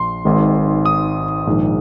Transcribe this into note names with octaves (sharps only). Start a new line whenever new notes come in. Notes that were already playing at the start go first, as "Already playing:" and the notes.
Already playing: A#1 C6
G#1 G#2 D#3
D#6
A#1 G#2 D#3